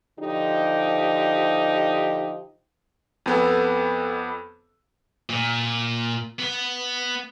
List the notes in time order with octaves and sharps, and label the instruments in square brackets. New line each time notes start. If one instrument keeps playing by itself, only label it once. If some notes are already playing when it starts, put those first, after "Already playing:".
[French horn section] D3 F3 D#4 G4
[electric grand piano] F2 B3 A4
[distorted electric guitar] A#2
B3